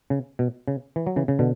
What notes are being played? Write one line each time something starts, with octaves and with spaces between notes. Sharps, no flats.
C#3
B2
C#3
E3
F#3
C#3 E3
C#3
B2 D3